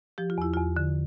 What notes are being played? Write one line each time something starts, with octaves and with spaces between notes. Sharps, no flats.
F3 G4
F4
E2 E4
E2 F4
D3